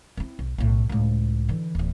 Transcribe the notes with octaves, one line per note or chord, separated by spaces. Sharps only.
C4 E4
B1
B1 A2
C#2 A2
D3 E3
D1 E2